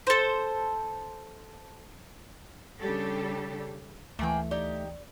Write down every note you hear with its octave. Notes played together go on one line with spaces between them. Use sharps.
A4 C5
C#3 G3 D4 G4 A4
D2 E3 A3 A#3 G#4 G5
D#4 G4 D5